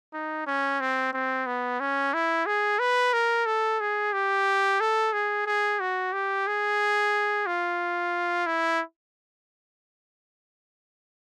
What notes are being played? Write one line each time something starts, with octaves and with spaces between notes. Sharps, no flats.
D#4
C#4
C4
C4
B3
C#4
E4
G#4
B4
A#4
A4
G#4
G4
A4
G#4
G#4
F#4
G4
G#4
F4
E4